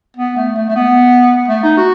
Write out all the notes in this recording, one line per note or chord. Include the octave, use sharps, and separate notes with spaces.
B3
A3
A3
A3
B3
A3
D#4
F#4